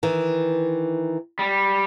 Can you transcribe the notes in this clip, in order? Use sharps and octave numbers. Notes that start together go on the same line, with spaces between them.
D#3 E3
G3